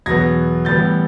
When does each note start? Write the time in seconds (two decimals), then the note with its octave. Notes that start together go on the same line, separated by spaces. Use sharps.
0.06 E2 B2 F#3 B3 G#6 A#6
0.65 A2 E3 G3 B3 G6 A6